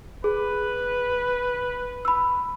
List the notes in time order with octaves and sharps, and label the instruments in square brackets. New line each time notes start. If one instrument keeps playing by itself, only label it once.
[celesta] G#4 [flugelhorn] B4
[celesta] B5 E6